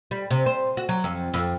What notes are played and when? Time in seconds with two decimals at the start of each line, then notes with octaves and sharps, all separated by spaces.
0.11 G3
0.31 C3
0.46 C5
0.77 F#4
0.89 F#3
1.04 F2
1.34 F2